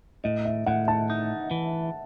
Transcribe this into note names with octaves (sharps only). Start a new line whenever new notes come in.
A2 D#5
E5
A2 F#5
A5
D#4
E3